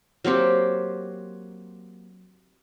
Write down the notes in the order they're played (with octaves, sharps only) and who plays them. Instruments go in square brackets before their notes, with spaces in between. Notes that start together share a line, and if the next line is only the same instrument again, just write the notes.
[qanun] F#3 A#3 C4 G4